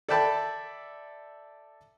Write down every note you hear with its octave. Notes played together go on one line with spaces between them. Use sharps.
A4 D5 E5 G5 A5 B5